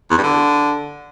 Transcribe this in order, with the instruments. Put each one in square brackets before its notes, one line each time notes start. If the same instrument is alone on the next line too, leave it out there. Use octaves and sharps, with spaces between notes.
[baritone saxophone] E2
G2
D3